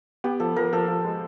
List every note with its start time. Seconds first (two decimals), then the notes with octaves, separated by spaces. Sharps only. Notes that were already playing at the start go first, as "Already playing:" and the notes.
0.24 B3 G4
0.40 F3 A4
0.56 F3 A#4
0.73 F3 A4
0.88 F3
1.04 G#3